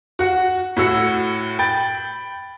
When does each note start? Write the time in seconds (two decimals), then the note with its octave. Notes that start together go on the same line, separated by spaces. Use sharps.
0.19 F#4 F#5
0.77 A2 F#4 E6 C#7
1.59 G5 B5 A6